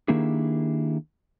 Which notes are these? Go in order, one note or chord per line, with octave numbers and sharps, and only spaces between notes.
D#3 A#3 D4 E4 G4 G#4